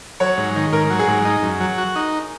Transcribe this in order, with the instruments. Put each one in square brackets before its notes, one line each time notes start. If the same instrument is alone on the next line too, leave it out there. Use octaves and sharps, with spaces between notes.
[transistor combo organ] F#3 [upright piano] C#5
[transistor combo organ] G#2
D#3
[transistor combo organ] G#2 [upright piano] A#4
[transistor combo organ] F#3
[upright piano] G#4
[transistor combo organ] G#2
D#4
F#2
F#3
F#4
D#4